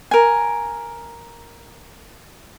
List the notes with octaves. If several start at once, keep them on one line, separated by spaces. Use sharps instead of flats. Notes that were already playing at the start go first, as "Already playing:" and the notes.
A#4 G#5